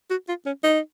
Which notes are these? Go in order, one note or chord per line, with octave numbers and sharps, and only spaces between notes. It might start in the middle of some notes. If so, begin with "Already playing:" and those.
F#4
F4
C#4
D#4